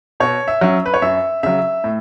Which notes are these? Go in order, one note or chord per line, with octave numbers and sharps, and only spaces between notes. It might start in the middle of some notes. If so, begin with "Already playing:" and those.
B2 C#5
E5
F#3 C#4
B4
C#5
F#2 E5
C#3 F#3 E5
A2